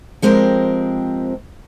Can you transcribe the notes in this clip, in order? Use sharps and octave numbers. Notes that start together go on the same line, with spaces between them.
F3 G#3 C4 G4 A#4